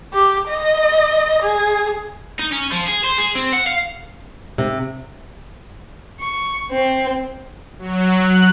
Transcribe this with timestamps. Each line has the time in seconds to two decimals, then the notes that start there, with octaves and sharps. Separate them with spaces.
0.13 G4
0.49 D#5
1.43 G#4
2.39 D#4
2.52 C#4
2.72 F3
2.87 G#4
3.04 C5
3.18 G#4
3.35 C4
3.53 F#5
3.67 F5
4.58 C3
6.20 C#6
6.71 C4
7.79 F#3
8.19 F#6